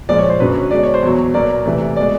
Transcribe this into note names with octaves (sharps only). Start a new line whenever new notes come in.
A#2 F3 G#3 D5
C#5
C5
F#2 D3 F#3 B4
C#5
B2 G#3 D5
C#5
C5
E2 B2 F#3 C#5
B2 F#3 A#3 D5
C3 E3 A3
B2 G#3 D5